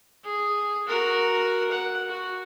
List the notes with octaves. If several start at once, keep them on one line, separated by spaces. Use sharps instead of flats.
G#4
F#4 A#4
F#5
F#4